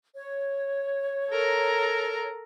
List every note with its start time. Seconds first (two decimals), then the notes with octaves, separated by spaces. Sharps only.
0.15 C#5
1.31 A4 A#4 A#5